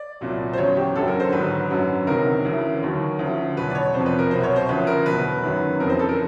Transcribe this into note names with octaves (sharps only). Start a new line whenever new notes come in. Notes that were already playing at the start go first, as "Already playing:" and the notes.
Already playing: D5
C2 A#2 F#3
C5
E2 C#3 F#3 C#5
G4
F#2 D3 F#3 A4
A#4
C5
G#2 D#3 F#3 B4
F#2 D3 F#3
C#2 C3 D#3 F#3 A#4
D2 C#3 E3
D#2 D#3 F#3
D2 C#3 F3
E2 B2 F#3 B4
D5
C#5
F2 C3 F3 C5
B4
A#4
C2 B2 F#3 C5
C#5
C5
D2 C#3 F3 B4
A#4
E2 B2 F#3 B4
F#2 D#3 F#3
F2 C#3 E3 A#4
C5
A4
A#4